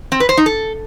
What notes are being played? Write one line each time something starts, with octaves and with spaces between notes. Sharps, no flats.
C4
B4
C5
D#4
A4